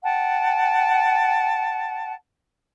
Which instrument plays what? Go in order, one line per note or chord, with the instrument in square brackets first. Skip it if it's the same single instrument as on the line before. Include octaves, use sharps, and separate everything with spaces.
[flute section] F#5 G5 A5